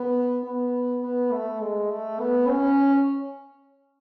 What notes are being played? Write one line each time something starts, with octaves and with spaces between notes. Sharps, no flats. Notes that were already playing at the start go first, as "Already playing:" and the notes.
Already playing: B3
B3
B3
A3
G#3
A3
B3
C#4